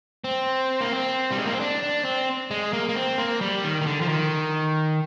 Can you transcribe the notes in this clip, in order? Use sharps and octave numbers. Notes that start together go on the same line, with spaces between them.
C4
A#3
C4
G3
G#3
A#3
C4
D4
D4
C4
G#3
A#3
A#3
C4
A#3
G3
D#3
D#3
D3
F3
D#3